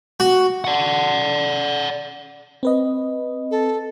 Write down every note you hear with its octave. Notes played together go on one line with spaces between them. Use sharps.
F#4
D5 F#5
C4 B4 D#5
A4